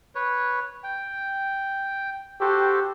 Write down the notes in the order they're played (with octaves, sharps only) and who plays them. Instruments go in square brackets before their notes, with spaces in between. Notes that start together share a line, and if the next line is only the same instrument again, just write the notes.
[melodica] B4 C#5
G5
[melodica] F#4 A4 C5 [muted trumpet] G4